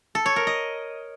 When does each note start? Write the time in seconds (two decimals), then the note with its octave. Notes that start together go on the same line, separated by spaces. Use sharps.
0.15 A4
0.26 C#5
0.36 A#4
0.47 D#5